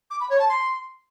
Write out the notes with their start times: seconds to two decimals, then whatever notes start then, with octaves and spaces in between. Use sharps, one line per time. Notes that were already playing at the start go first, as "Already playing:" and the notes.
0.11 D6
0.20 B5
0.30 C#5
0.39 A5
0.49 C6